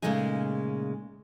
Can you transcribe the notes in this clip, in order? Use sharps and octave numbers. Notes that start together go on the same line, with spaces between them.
A#2 C#3 G#3 A3 D#4 G#4